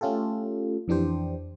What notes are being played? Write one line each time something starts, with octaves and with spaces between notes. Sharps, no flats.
A3 C#4 F4 G4 A4
F2 E3 D4 G4 C5